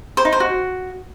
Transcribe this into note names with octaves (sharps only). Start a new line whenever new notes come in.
C5
D#4
C5
F#4